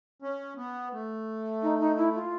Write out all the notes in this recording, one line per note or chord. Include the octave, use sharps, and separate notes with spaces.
C#4
B3
A3
D#4
D#4
E4
F4